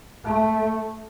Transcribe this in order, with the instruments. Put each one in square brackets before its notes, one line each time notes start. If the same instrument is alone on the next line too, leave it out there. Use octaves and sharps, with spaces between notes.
[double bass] A3